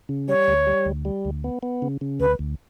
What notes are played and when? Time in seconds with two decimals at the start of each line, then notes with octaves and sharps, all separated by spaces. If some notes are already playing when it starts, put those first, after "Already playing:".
0.09 C#3
0.28 G3 C#5
0.48 D2
0.67 G3
0.85 D2
1.05 G3
1.25 D2
1.44 B3
1.63 B3
1.82 C#3
2.01 C#3
2.20 D2 B4
2.39 D2